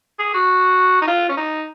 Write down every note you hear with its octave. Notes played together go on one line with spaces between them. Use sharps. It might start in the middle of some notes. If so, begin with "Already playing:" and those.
G#4
F#4
D#4
F4
C#4
D#4